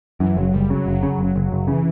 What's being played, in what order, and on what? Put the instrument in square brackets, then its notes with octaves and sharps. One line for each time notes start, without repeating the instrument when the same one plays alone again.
[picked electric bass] F#2 [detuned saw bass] E3
[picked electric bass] F#1 [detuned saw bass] F#3
[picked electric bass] F#1 [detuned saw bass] G3
[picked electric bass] C#3 [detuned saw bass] F#3
[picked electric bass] F#1
C#3
F#1
F#1
F#1
[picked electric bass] C#3 [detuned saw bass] E3